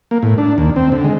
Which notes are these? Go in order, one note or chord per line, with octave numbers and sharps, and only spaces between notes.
A#3
A2
D4
D#2
C4
D3
G#3